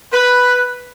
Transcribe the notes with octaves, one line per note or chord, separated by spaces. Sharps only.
B4